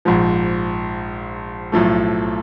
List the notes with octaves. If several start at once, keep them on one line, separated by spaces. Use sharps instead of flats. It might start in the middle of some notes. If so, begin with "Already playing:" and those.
A#1 G#2 F3
B1 A2 F3 A3